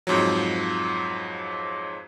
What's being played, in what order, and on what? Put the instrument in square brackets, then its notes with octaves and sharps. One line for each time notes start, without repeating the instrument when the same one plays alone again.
[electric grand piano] F2 G#2 F3 F#3